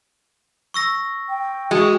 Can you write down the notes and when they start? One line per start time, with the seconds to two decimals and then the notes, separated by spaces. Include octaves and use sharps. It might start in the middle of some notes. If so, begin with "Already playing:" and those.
0.74 C#6 E6 A#6
1.29 G5
1.71 G#3 F#4